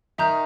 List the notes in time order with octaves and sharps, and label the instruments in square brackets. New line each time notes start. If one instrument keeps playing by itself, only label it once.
[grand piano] D#3 D#4 [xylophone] E5 A#5 D#6 G6